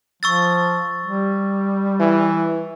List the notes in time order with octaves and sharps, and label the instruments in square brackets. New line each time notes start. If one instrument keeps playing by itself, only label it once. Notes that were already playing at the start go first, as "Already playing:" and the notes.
[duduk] F3 [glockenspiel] C#6 E6 A6
[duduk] G3
[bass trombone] E3